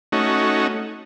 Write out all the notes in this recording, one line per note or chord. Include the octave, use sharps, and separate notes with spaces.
A3 C#4 D#4 F#4